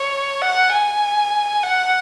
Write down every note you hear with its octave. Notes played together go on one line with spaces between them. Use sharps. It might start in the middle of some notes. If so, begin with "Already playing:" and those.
Already playing: C#5
F#5
G#5
F#5